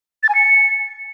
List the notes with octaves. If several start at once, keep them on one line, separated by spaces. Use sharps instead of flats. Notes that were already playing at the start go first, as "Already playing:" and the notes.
A6
G#5
C#7